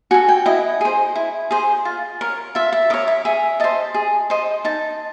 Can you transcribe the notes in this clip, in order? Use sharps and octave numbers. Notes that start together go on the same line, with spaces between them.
F#4 A4 G#5
G5
E4 D#5
G#4 C5
E4
G#4 C5
F4
A#4 C#5
F4 E5
E5
A#4 C#5 D#5
E5
G#4 E5
C5 D#5 A5
G#4
C5 D#5
D#4 A5